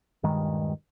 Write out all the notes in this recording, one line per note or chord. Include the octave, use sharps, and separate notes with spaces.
D#1 G2 D#3 G#3